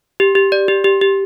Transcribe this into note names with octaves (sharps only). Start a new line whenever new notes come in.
G4
G4
D5
G4
G4
G4